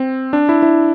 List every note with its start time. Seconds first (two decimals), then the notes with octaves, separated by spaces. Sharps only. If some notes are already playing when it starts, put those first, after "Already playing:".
Already playing: C4
0.33 D4
0.49 E4
0.62 E4